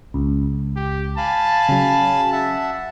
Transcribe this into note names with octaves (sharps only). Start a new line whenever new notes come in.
C#2
G4
F5 G#5 A5 B5
C#3 F#3
E5 F#5 A5